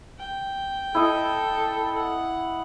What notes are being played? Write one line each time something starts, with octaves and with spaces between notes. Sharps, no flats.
G5
E4 A4 D#5
F#5